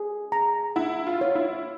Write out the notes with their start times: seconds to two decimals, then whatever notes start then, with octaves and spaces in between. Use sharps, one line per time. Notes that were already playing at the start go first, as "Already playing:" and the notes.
Already playing: G#4
0.32 A#5
0.76 E4 F#5
1.07 F4
1.21 C#5
1.35 E4